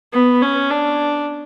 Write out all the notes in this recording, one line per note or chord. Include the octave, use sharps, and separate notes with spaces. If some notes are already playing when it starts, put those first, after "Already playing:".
B3
C#4
D4